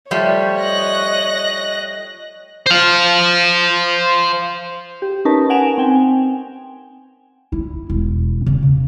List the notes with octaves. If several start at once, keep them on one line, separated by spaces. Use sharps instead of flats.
F3 G3 A3 C#5
D#5 F#6 A#6
C5 F5
G4
C#4 D#4 A#4 B4 A5
F#5 G#5 D7 E7 F7
C4 G5 G#5
E4
E1
C#3
C#3